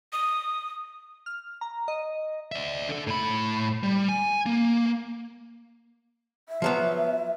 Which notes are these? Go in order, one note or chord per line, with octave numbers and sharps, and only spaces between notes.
D#6
F6
A#5
D#5
D5 E5
D3 A4
A2 B5
G3
G#5
A#3
E5
F3 F#3 B3